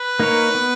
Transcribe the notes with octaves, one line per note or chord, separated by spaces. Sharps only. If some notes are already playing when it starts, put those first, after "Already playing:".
Already playing: B4
A#3 D#4 A#4 C#5
B3